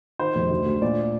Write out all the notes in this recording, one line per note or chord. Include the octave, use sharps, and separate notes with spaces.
D#3 C5
F1
D2
D2
A#2 D5